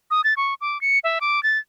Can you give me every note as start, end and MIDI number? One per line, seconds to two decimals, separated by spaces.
0.11 0.21 87
0.24 0.34 93
0.37 0.54 85
0.61 0.80 86
0.81 0.99 97
1.04 1.19 76
1.21 1.42 86
1.43 1.58 93